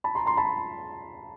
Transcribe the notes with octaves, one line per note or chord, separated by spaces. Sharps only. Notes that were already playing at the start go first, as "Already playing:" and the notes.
A5 B5
A#5 C6
A#5 C6
A5 B5